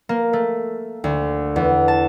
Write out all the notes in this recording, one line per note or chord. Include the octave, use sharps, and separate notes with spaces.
A#3
A3
D2
E2
A5